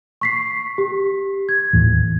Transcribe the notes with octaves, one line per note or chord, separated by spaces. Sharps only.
C#6 B6 C7
G4
G#6
D#2 A2 E3